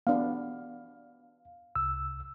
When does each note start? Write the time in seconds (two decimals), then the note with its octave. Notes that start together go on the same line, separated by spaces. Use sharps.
0.07 B3 D4 F5
1.75 C2 E6